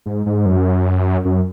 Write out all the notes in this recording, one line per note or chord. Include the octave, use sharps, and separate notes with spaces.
G#2
G#2
F#2
F#2